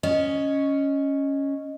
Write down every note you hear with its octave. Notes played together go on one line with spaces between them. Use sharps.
C#4 D#5